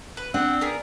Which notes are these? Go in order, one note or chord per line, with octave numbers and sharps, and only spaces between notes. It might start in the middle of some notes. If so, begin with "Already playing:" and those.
B4
C4 D4 F#5
B3 G#4 A#4